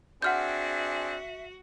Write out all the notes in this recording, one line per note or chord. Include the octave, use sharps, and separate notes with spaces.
C4 D4 F#4 G#4 E5 F#5 F6 G6